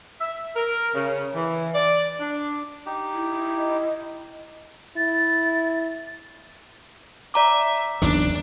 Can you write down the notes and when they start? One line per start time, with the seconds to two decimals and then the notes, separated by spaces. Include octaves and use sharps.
0.21 E5
0.56 A#4
0.94 C#3
1.35 E3
1.74 D5
2.20 D4
2.86 D#4 G4
3.13 E4
3.58 D#5
4.97 E4 A6
7.34 D5 E5 A#5 D6
8.02 F#1 E2 D#3 D4